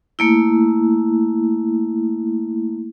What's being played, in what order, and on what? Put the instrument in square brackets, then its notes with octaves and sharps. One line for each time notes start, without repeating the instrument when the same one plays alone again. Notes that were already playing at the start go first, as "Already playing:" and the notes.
[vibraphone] A3 A#3 E4